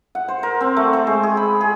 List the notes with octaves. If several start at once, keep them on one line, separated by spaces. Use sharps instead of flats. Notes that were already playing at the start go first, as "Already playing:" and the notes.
F#5
C5
A#4
C4
A3
C5
G#3
G#4
B5
G#4